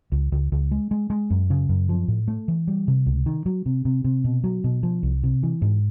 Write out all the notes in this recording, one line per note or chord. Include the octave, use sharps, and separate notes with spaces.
C#2
C#2
C#2
G#3
G#3
G#3
F#2
C#3
F#2
F3
A2
A3
E3
G3
C3
C#2
D#3
F#3
C3
C3
C3
B2
F#3
B2
F3
C2
C3
E3
G#2